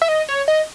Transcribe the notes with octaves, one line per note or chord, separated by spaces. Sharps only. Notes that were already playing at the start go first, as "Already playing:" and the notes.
E5
D#5
C#5
D#5